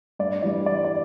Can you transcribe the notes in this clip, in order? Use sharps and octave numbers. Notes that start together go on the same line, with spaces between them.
G2 D5
E3 G3 D5
G2 D5
D5